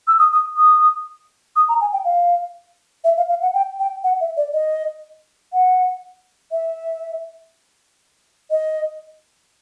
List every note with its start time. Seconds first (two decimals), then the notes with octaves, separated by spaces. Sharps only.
0.08 E6
0.19 D#6
0.32 D#6
0.57 D#6
1.56 D#6
1.69 A#5
1.81 G#5
1.93 G5
2.05 F5
3.04 E5
3.17 F5
3.29 F5
3.42 F#5
3.54 G5
3.79 G5
4.04 F#5
4.21 E5
4.37 D5
4.53 D#5
5.53 F#5
6.52 E5
8.51 D#5